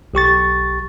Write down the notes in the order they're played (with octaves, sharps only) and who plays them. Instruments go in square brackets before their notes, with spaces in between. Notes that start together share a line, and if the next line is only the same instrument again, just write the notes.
[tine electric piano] B1 G4 C#6 A6